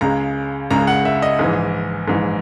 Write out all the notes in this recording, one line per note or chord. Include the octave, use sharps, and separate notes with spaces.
C#2 C#3 G#3 A#5
C#2 C#3 G#3 A#5
F#5
E5
D#5
A#1 G#2 E3
A#1 G#2 E3